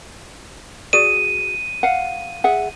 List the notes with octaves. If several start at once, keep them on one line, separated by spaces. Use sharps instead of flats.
F#4 G#4 D5 D#7
F5 F#5
G#4 E5 F#5